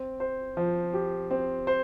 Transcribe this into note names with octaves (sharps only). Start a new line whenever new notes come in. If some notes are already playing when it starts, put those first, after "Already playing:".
Already playing: C4
C5
F3
G4
C4
C5